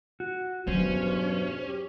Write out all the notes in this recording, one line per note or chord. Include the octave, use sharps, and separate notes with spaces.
F#4
E2 G2 B2 F#3 C#4 C5
G4